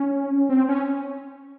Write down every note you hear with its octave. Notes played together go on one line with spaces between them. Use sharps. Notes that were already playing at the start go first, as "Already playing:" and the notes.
Already playing: C#4
C4
C#4